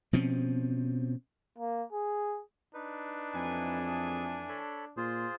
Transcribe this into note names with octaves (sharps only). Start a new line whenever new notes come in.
B2 F3 C4 C#4
A#3
G#4
D4 D#4 B4
F2 E3 A3 G#5
G#4
A4 C#5 B5
A#2 F4 G#4 C5